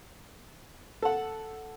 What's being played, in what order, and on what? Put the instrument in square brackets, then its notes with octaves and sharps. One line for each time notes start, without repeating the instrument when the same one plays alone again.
[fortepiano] A4 F#5